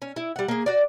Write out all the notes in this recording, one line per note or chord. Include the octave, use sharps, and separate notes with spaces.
C#4
E4
G3 F#5
A#3 G#4
F#4 D5